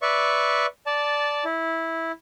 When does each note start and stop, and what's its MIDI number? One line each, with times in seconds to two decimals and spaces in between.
0.02 0.66 71
0.02 0.66 74
0.02 0.66 76
0.02 0.66 85
0.86 1.44 74
0.86 1.44 81
1.45 2.12 64